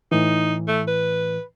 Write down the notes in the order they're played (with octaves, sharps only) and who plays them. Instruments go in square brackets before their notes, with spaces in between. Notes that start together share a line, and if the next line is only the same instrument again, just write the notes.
[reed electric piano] A2 E3 [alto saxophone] D#4
[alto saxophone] A3
B4